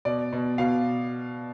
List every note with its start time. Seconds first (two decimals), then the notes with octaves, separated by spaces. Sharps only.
0.05 B2 D5
0.33 B2
0.58 B2 F5